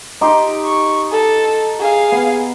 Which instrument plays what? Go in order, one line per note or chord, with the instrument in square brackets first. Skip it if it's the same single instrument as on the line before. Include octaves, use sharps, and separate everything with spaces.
[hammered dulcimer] D#4 G4 C6
[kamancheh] C#6
A4
G#4 F5
[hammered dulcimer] B3